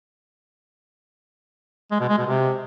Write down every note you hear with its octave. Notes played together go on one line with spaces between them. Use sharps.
G#3
B2
G#3
B2
C3